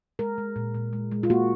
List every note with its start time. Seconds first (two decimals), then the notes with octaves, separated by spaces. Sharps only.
0.19 G#3 A#4
0.38 G#3
0.56 A#2
0.74 A#2
0.93 G#3
1.12 G#3
1.23 F4
1.30 A#3 F#4